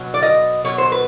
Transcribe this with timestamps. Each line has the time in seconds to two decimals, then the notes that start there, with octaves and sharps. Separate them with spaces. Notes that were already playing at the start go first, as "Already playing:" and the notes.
Already playing: B2 F#3
0.14 D5
0.22 D#5
0.64 B2 F#3 C#5
0.78 C5
0.92 B4